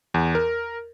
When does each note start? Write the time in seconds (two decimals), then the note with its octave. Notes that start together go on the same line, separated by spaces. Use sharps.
0.14 E2
0.35 A#4